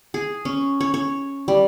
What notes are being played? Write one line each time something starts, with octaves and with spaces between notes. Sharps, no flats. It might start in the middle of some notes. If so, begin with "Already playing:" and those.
G#4
C#4
C#5
C#5
G3